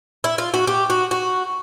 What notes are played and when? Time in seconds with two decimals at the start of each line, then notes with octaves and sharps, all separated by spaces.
0.24 E4
0.38 F4
0.54 F#4
0.67 G4
0.90 F#4
1.11 F#4